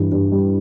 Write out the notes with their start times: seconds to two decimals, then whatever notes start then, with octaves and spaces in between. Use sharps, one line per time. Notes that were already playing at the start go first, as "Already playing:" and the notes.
Already playing: G2 E3
0.12 G2
0.32 G3